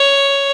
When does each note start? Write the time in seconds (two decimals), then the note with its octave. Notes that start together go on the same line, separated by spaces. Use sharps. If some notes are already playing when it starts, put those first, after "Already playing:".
Already playing: C#5